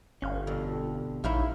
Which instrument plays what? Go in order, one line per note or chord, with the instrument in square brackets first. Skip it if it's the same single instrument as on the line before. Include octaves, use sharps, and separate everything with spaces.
[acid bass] G1 [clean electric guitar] C#4 F5
[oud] F2 [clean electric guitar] B2 D3
[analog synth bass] A#1 [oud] F#2 D#4 E4 [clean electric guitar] E5 F5